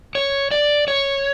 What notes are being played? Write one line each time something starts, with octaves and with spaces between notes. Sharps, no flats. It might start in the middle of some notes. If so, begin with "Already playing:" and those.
C#5
D5
C#5